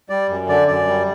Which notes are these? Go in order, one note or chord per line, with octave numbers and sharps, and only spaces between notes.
G3 D5
F#2
D3 D5
F#2 D5
G3